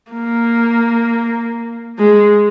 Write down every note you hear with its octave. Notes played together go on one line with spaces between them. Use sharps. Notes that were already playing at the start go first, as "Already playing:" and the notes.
A#3
G#3